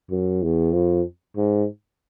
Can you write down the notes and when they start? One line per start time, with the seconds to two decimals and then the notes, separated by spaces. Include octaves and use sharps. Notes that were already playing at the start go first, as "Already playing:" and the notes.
0.10 F#2
0.42 E2
0.73 F2
1.37 G#2